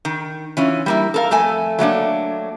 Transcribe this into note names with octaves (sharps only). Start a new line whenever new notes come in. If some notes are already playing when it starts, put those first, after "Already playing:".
D#3
E3 C#4 F4
G3 A#3 E4
A4 A#4 F5
F2 A3 A4 G#5
F#3 A3 A#3 D4